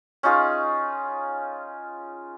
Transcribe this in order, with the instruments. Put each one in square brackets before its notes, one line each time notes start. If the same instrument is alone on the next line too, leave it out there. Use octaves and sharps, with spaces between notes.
[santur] C#4 D#4 F4 G#4